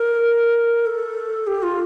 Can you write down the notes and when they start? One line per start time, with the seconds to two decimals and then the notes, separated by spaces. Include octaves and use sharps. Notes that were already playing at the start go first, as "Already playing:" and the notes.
Already playing: A#4
0.86 A4
1.47 G4
1.63 F4